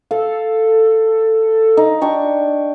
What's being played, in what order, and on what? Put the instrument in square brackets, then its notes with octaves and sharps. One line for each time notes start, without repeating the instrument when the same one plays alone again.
[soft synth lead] A4 [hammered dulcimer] F5
[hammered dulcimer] D#4
D4 G4 C#6